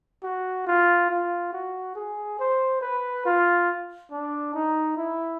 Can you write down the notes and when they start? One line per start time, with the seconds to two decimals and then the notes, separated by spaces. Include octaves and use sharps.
0.23 F#4
0.67 F4
1.10 F4
1.53 F#4
1.95 G#4
2.39 C5
2.81 B4
3.26 F4
4.12 D4
4.54 D#4
4.97 E4